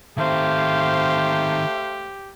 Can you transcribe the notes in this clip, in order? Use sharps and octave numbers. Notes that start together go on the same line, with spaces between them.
D#3 A3 C4 G4 C5 F5